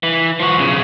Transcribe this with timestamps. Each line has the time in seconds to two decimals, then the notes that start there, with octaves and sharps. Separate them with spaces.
0.03 E3
0.40 F3 F#4
0.58 B1 C#3